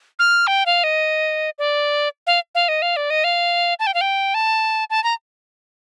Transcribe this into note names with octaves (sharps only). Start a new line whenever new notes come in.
F6
G5
F5
D#5
D5
F5
F5
D#5
F5
D5
D#5
F5
A5
G5
F5
G5
A5
A5
A#5